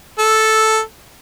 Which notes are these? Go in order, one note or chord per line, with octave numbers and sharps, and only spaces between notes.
A4